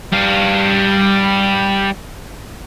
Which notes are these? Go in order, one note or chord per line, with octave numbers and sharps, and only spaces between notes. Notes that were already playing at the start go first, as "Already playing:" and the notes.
G3 F5